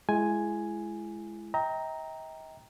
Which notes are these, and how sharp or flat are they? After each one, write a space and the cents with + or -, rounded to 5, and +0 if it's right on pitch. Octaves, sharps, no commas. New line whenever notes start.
G#3 +20 E4 +30 G#5 +0
D#5 +45 G5 +0 A#5 +0